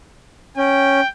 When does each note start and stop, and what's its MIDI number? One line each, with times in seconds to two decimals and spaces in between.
0.57 1.01 61
0.57 1.07 79